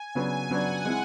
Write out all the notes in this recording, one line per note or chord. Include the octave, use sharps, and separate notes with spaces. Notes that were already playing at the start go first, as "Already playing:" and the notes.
Already playing: G#5
C#3 F#3 B3 D4
C#3 F#3 B3 D4 F#5
G#3 C4 E4